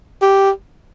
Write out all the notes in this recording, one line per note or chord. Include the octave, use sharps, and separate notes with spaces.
G4